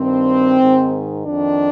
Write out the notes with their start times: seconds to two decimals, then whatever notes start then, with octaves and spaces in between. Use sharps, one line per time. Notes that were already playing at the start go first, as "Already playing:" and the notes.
Already playing: G2 D#3 C4
0.59 G#2 D#3
1.26 F2 D#3 D4